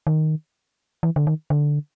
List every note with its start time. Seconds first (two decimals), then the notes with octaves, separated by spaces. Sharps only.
0.07 D#3
1.03 E3
1.16 D3
1.27 D#3
1.50 D3